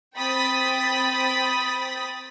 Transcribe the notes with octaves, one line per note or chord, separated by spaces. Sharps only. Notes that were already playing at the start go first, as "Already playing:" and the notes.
C4 G5 B5 D#6 A6 B6